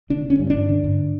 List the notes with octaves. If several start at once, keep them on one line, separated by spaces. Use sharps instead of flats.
D3 D4
D3
C#4
G2
G2 D4
D3
G2